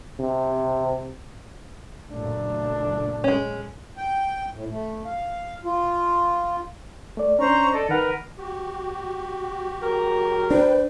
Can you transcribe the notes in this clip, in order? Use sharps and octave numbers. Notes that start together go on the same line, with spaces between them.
C3
F#1 A#2 A3 D4
G#3 C#4
G5
A2
A3
F5
F4
A3 D5
C#4 D4 C5 A#5 C#6
A4 D5 D#5
D#3 A#4 B4 F#5
F#4 G4
F#3 G#4 A#4
D4 B4 C5 G5